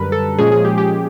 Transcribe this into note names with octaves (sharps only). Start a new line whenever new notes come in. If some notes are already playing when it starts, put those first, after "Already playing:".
Already playing: F#2 D3 G3 A#4 B4
A4
A#2 F3 G#3 C#4 G#4
G#4
G4
G4